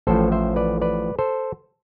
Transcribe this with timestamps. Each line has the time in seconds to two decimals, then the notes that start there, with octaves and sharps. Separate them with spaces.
0.07 A1 A2 F3 A4 C5
0.32 C5 E5
0.56 B4 D5
0.82 B4 D5
1.19 A4 C5